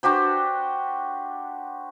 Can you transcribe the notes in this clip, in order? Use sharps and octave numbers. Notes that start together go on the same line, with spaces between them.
D4 F#4 G4 C5